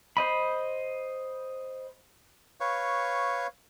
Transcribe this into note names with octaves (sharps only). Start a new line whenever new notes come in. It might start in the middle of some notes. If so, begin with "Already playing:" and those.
C5 D#5 B5
B4 C#5 F5 C#6